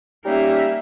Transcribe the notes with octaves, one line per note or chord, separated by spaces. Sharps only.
G3 A#3 C#4 D#4 E5